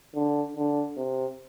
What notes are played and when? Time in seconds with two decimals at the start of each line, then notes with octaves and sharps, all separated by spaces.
0.15 D3
0.57 D3
0.97 C3